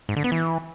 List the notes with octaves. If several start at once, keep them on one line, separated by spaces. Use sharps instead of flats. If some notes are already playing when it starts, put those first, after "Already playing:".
G#2
D3
B3
E3